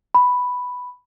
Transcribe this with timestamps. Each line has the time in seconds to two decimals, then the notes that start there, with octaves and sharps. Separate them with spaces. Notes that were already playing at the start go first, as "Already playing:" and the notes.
0.15 B5